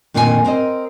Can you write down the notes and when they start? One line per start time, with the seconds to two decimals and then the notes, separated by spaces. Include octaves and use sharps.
0.14 F2 A#2 D3 D#3 F#4 G#5
0.45 C4 A#4 C5 D#5